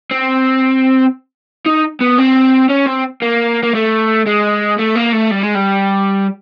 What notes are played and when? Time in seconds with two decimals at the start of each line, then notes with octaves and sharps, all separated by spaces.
0.11 C4
1.66 D#4
2.01 B3
2.18 C4
2.70 C#4
2.87 C4
3.22 A#3
3.63 A#3
3.75 A3
4.26 G#3
4.79 A3
4.95 A#3
5.12 A3
5.31 G3
5.43 G#3
5.55 G3